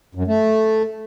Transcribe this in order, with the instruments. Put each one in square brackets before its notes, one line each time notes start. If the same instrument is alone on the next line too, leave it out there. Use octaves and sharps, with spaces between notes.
[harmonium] F#2
A3